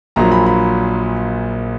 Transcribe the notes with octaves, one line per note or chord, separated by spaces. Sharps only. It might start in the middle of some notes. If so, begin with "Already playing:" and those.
A#1 A#2 F#3 A#5
B5
B5